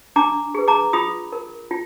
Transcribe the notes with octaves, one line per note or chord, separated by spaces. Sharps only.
D4 A#5 D6
G#4 B4
A#5 D6
F4 B5 D#6
A#4
F4